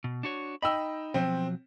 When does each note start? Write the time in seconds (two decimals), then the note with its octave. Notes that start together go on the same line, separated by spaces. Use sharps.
0.04 B2
0.23 D4 F#4 C#5
0.62 D#4 D#5 G5 B5 E6
1.14 B2 F3 F#3 C4